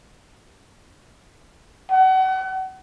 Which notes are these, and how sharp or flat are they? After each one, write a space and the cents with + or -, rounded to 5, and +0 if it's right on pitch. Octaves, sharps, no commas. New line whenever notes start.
F#5 +35